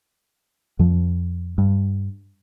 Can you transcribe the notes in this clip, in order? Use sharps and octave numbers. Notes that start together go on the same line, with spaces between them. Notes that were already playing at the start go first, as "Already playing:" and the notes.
F2 F3
G2